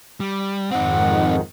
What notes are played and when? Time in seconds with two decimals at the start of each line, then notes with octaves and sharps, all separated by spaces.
0.20 G3
0.71 F2 G#2 D#3 C4 D#4 F#5